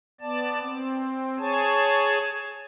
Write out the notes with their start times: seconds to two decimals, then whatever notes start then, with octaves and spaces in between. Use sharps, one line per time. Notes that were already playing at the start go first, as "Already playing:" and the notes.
0.21 B3 D5 A5
0.60 C4
1.38 G#4 C#5 G#5 A5